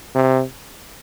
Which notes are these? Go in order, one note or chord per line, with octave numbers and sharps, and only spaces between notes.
C3